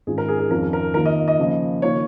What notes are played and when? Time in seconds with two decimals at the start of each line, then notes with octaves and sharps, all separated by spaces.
0.07 G#2 D#3 C#4 F4 G#4
0.18 A#4
0.29 G#4
0.39 G#4
0.50 F2 D#3 C#4 F4 A#4
0.73 A#4
0.94 D#2 D#3 A#3 F4 A#4
1.05 D#5
1.28 D#5
1.39 C#3 F3 A#3
1.82 D#3 A#3 F4 C#5